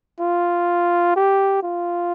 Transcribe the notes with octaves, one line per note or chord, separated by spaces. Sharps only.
F4
G4
F4